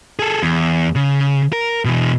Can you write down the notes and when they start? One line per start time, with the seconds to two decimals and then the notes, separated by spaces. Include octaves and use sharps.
0.19 G#4 A4
0.43 E2
0.96 C#3
1.53 A#4
1.85 B2 E3